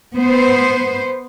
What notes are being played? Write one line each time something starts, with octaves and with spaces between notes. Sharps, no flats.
B3 C5